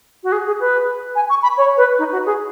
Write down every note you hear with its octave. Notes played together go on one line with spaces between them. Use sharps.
F#4
G#4
G#4
B4
G#5
C#6
B5
C#5
B4
D#4
F#4
G#4